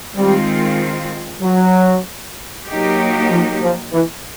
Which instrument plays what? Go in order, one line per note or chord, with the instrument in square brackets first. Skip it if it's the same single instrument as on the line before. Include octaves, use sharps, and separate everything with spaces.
[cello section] D#3 G#3 C4 F4 [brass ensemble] G3
[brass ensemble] F#3
[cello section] F#3 A#3 D#4 G4
[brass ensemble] F3
F3
E3